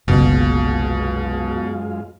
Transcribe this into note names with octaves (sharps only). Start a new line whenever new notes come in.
F#1 C2 F#2 B2 G#3 A#3 F4